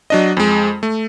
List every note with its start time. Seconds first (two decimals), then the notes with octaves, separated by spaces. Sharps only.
0.10 F#3 D4 D#5
0.37 F2 G#3
0.83 A3